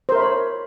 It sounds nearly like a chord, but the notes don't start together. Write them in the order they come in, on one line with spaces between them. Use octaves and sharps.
C5 A#4 E5 B5 C#5